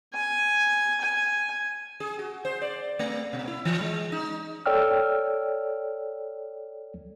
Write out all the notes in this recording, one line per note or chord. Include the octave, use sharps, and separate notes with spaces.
G#5
G#5
G#4
F#4
C5
D5
A3
B2
E4
E3
G#3
D#4
A4 C#5 D5 G5 E6 F6